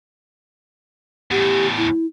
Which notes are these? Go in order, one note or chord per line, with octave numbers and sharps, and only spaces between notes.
E2 A2 G4
E4